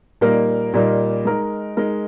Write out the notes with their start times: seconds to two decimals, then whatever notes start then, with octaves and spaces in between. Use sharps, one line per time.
0.21 A#2 G3 A#3 D#4 A#4
0.73 A#2 G3 A#3 D#4 A#4
1.25 G#3 D#4 A#4
1.77 G#3 D#4 A#4